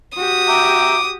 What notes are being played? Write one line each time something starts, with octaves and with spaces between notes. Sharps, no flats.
F#4 G4 D#6
E5 G5 A#5 D6